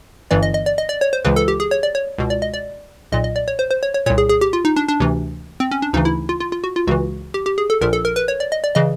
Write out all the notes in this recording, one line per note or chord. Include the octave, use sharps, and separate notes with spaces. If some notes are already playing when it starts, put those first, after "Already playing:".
G1 G2 E3 D5
D#5
D#5
D5
D#5
D5
C#5
C5
C#2 C#3 E3 B4
A4
G4
G#4
C#5
D5
C#5
C#2 B2
D5
D#5
D5
B1 A#2 D#5
D#5
D5
C#5
C5
C5
C#5
C#5
C2 A#2 C#5
G#4
G#4
G4
F4
D#4
D4
D4
D2 C3 E3
C4
C#4
D4
D2 C#3 E3 D#4
E4
F4
F4
F4
F#4
F4
C#2 C#3 E3 F#4
G4
G4
G#4
A4
A#1 A#2 A#4
A4
A#4
B4
C#5
D5
D#5
D5
C#3 E3 D#5